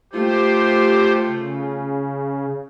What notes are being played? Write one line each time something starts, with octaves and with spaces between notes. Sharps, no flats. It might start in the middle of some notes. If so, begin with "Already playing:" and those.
A3 F4 G4 C5
C#3